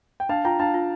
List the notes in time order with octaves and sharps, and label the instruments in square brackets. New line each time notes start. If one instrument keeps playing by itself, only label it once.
[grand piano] G5
[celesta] D4 [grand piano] F5 A5
[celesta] F4 [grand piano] G5 A#5
[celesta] D4 [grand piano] F5 A5
[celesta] F4